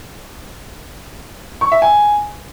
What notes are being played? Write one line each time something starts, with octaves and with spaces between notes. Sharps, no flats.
C#6
E5
G#5